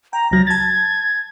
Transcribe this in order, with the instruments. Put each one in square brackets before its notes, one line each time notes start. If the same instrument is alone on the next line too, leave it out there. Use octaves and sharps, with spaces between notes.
[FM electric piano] G5 [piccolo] A#5
[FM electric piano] C#2 F#3 [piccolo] A#6
[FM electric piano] A5 A6 [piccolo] G#6